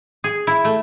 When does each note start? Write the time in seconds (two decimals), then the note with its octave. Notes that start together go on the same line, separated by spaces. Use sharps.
0.24 G#4
0.47 E4
0.65 A3